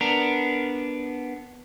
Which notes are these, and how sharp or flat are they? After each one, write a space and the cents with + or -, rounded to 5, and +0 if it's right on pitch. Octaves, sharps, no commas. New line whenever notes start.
B3 +0 D4 +0 A#4 +0